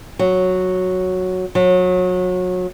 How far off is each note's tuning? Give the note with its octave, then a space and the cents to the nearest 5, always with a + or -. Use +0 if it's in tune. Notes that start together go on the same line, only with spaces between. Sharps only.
F#3 -5
F#3 -25